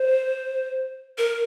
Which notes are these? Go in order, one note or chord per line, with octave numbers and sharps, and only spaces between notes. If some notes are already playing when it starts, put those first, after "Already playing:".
Already playing: C5
A#4